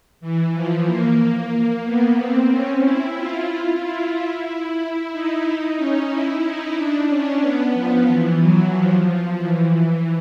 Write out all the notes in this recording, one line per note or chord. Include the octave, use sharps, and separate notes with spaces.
E3
F3
A#3
B3
C4
C#4
E4
F4
F4
E4
E4
D#4
D#4
C#4
E4
D#4
D4
C#4
B3
F3
E3
F#3
F3
E3
E3